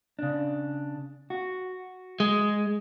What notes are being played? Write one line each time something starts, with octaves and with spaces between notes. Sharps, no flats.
C#3 D4
F#4
G#3